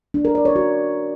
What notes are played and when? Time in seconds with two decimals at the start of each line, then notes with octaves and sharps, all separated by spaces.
0.14 D4
0.25 A#4
0.35 D5
0.45 C#5
0.56 F#4